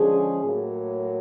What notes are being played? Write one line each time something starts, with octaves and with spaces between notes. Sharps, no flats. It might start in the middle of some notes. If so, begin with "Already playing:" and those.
Already playing: D3 F3 G#3 C#4 G#4
A2 F#3 A#3